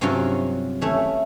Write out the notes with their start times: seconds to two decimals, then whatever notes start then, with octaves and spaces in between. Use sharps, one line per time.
0.01 G2 C3 F#3 C#4 F4 F#4
0.81 E3 A3 C#4